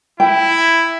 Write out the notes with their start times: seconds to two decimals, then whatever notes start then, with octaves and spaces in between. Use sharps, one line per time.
0.20 E4 G5